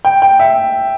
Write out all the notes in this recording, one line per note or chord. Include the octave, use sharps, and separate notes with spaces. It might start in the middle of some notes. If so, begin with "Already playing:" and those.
G5
G5
E5